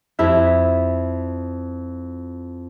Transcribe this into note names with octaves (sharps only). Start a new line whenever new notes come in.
F2 E4 E5 B6